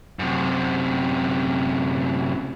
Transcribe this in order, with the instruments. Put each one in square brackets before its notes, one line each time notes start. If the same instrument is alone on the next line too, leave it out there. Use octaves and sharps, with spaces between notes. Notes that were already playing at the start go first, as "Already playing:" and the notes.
[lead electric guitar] F#2 C3